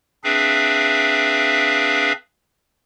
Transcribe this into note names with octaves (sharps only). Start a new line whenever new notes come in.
C4 D4 G#4 B4 E5 F5